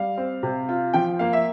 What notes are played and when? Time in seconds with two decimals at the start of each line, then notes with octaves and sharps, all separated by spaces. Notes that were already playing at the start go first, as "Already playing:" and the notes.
Already playing: G3 F5
0.18 C4
0.43 C3
0.69 F4
0.94 F3 G5
1.19 A#3 F5
1.33 E5